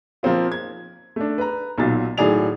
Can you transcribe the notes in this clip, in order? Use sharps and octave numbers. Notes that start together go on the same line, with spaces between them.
F3 A#3 C4 F4
G#6
A3 D4
B4 A#5
B1 A#2 F#3 A6
A2 D#3 F#3 G#4 D5 F7